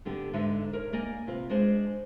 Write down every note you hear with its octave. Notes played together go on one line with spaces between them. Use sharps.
G2 D3 B3 G4
G#2 D3 D#4 B4 E5
A#4 B4 C#5
A#3 D5 D#5 G#5
C3 F4 B4
G#3 D4 G#4 C5